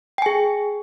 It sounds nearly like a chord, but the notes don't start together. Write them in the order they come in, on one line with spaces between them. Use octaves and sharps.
G5 G#5 G#4